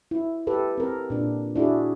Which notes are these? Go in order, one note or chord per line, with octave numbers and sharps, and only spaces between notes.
E4
G4 A4 B4
C4 A#4
A#2 D4
D4 E4 F#4 G#4